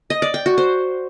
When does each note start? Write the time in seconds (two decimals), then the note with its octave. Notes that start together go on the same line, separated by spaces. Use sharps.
0.10 D#5
0.22 D5
0.34 G5
0.46 F#4
0.58 C5